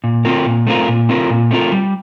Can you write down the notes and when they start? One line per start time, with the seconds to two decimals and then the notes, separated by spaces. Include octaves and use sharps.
0.04 A#2
0.25 A3 C4 F4 A#4
0.46 A#2
0.67 A3 C4 F4 A#4
0.88 A#2
1.09 A3 C4 F4 A#4
1.30 A#2
1.51 A3 C4 F4 A#4
1.72 G3